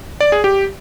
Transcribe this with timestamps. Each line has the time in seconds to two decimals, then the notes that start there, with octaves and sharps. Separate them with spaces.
0.21 D5
0.32 G#4
0.44 G4